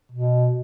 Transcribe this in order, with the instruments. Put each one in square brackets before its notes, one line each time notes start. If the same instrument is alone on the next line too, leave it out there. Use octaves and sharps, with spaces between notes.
[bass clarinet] B2